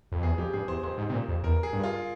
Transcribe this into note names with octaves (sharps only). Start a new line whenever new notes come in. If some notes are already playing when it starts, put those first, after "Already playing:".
F2
E2 G#4
F2 G4
G2 G#4
E2 C5
F2 C5
G#2
C3
A#2
F2
E2 A#4
G#4
G2
F4